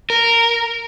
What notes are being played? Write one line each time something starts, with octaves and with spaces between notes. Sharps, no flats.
A#4